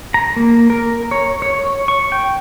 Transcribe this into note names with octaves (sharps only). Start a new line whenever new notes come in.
A#5
A#3
A#4
C#5
C#5
C#6
G5